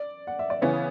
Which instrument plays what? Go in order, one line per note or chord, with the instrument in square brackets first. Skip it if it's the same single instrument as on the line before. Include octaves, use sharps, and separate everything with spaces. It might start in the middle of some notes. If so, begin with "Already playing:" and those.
Already playing: [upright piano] D5
F#5
E5
D5
[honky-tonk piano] C#3 E3 B3 [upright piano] C#5